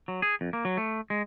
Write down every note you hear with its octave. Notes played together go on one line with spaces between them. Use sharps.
F#3
G#4
F2
A#3
F#3
A3
G#3